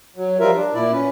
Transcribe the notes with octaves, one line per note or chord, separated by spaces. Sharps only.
F#3
F3 G3 F4 A#4 E5
D4
A#2 E4 D5
C#4 B4